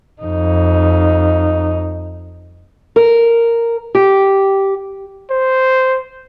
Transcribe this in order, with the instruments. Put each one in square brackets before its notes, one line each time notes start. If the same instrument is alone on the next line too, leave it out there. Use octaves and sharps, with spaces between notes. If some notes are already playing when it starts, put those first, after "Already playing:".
[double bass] F2 D#4
[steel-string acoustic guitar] A#4
G4
[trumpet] C5